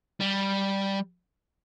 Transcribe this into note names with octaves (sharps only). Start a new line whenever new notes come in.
G3